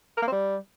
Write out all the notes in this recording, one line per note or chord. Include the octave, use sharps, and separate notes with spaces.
A#4
A#3
C4
G3